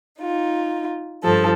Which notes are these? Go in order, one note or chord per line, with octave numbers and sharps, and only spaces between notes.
D#4 F4
G2 F3 A4